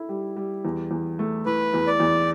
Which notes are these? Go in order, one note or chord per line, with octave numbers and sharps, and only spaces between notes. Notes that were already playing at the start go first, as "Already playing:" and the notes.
Already playing: E4 A4
G3
G3
E2
E2
A3
E3 B4
E2
D5
E2